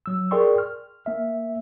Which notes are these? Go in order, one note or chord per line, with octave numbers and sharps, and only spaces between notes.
F#3 E6
G#4 A#4 D5 G5 C6 C#6
F6
A#3 E5